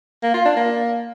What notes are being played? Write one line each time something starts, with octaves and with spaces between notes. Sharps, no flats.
A#3
F4
D4
A#3